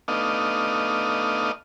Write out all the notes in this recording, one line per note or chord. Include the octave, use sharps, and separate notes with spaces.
A3 B3 D4 D#4 D#5 F5